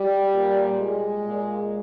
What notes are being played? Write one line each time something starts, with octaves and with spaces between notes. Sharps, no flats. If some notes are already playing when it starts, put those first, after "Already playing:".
Already playing: G3
A#2
G#3
A#2